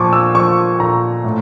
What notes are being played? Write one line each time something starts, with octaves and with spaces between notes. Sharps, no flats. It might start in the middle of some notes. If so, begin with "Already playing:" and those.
Already playing: A#2 F3 A5 C#6 D6
E6
F3 C#6
A#2 A#5
A2